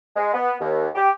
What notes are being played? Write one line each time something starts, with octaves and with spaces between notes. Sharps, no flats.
G#3
B3
D#2
G4